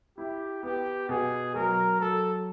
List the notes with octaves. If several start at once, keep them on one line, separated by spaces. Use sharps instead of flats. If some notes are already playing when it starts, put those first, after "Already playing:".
E4 G4
B3 G4
B2 G#4
F#3 A#4
F#3 A4